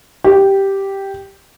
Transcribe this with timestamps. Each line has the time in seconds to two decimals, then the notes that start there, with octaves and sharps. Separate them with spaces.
0.24 G4